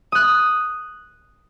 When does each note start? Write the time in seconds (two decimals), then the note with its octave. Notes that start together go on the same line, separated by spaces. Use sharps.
0.12 D#6 F#6